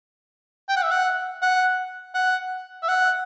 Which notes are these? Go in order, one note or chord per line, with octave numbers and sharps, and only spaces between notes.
G5
F#5
E5
F#5
F#5
F#5
E5
F#5